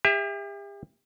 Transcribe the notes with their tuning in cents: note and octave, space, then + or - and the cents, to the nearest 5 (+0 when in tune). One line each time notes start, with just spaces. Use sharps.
G4 +40 E5 +0